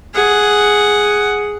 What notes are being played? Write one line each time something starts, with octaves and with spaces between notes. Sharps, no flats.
G#4 F#5